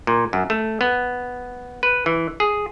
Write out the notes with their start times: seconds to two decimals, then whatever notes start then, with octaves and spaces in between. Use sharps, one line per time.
0.07 A#2
0.33 F#2
0.50 A3
0.81 B3
1.83 B4
2.06 E3
2.40 G#4